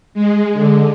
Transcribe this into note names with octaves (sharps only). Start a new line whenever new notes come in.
G#3
D3